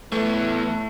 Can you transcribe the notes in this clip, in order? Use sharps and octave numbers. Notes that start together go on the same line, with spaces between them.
A2 E3 A3 B3